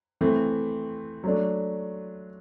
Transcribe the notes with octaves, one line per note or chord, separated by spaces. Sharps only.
E3 A3 C4
F#3 A3 D4